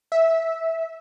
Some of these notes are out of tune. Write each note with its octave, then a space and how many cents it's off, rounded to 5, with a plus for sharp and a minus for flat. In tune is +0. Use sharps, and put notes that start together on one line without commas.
E5 -10